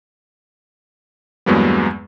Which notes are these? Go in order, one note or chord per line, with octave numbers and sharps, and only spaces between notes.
E2 G2 F#3 G#3 A#3 B3